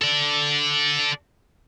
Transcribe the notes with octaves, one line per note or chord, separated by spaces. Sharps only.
A4 D5